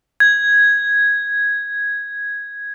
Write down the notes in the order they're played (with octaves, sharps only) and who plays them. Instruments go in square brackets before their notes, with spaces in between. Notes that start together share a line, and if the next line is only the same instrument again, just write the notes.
[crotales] G#6